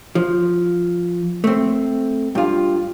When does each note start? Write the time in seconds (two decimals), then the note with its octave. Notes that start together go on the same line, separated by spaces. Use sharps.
0.15 F3
1.44 A3 C4
2.35 G2 F4